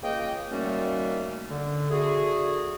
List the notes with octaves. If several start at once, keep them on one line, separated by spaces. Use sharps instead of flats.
C#2 C#3 A#3 D#5 G5
D#3 F#3 G3 A3 A#3 C#4
D3
D3 A3 F#4 G#4